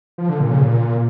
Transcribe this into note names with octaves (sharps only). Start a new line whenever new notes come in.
F3
D3
A#2
C#3
A#2